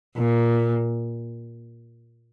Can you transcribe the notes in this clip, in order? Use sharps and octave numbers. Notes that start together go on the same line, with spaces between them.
A#2